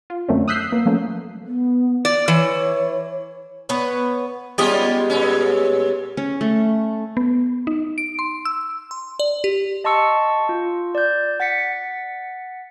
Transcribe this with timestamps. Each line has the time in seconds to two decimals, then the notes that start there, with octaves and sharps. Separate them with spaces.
0.10 F4
0.28 F#2 D3 A3 A#3 C4 C#4
0.48 D#6 E6 F#6 G6 B6 C7
0.72 A#3 B3
0.86 F3 F#3 A3 A#3 C#4
1.46 B3
2.05 D5
2.28 E3 C#5
3.69 B3 B4 C#5
4.58 G3 G#3 B3 C#4 F4 G4
5.10 A#2 C#4
6.17 C#4
6.41 A3
7.17 B3
7.67 D#4
7.98 D7
8.19 C6
8.45 E6
8.91 C6
9.19 D5
9.44 G4
9.84 D#5 A5 C6 C#6 E6 C#7
10.49 F4
10.95 D5 G6
11.40 F#5 A6 B6 C#7